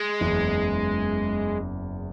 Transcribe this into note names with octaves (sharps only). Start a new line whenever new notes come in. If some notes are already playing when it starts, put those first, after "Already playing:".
Already playing: G#3
F#1 E2 C#3 E3